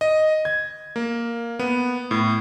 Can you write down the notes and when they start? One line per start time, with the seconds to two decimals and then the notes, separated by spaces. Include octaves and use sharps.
0.01 D#5
0.45 G#6
0.96 A#3
1.59 B3
2.11 A2